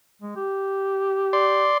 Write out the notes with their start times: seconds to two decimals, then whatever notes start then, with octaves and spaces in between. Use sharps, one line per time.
0.22 G#3
0.36 G4
1.33 D5 C6